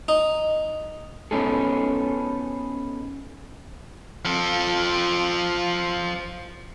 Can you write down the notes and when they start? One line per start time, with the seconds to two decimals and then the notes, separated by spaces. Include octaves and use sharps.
0.08 D#4
1.31 B3 C#4 D#4 G#4 A4
4.25 F3 A4